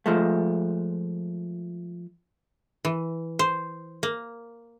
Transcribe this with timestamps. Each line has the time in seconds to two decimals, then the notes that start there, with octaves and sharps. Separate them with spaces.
0.06 F3 G#3 A3
2.85 E3
3.39 C5
4.03 A#3